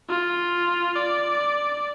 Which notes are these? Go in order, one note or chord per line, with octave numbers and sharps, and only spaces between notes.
F4
D5